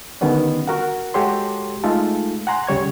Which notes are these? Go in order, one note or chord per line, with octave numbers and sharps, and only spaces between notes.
D3 D#3 G3 B3 C#4 D4
F#4 A#4 F#5
G#3 F#4 G4 A4 C#5 C6
G#3 A3 D#4 F4 A4
F#5 G#5 A#5 C6 F#6
D2 C#3 G3 C#5 G#6